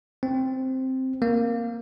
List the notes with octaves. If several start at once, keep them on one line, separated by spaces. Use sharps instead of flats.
C4
A#3